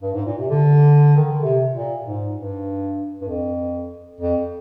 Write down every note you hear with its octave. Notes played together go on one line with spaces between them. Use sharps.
G2
G#2
A#2
C3
D3
D#3
D3
C3
A#2
G#2
G2
G2
F2
F2